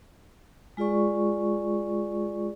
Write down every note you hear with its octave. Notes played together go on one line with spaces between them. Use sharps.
G#3 F4 G#4 D5 C#6